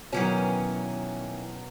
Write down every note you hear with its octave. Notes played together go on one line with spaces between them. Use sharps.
B2 D#3 E3 F#3 C#4